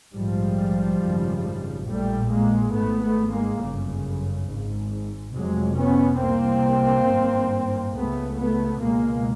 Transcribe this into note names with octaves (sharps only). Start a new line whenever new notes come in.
A#1 G#2 F3 G3
G#1 F#2 C#3
A#1 A#2 G3 A3
G#3 A#3
G#1 G#2 A3 B3
A3 B3
G#3 A#3
G1 F#2 C#3
G#1 G#2
F1 F2 C3 F#3 G#3
B3 C#4
C2 C3 A#3 C4
G#1 G2
C#2 C#3 A3 B3
A3 B3
C#2 B2 G#3 A#3